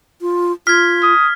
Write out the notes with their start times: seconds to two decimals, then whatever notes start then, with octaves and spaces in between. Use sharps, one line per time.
0.21 F4
0.67 F4 F6 G#6 B6
1.03 D#6